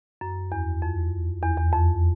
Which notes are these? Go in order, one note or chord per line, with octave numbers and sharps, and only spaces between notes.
F#2
E2
F2
E2
E2
F2